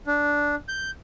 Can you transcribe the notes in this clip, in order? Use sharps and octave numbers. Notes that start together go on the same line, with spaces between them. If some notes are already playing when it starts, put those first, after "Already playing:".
D4
G6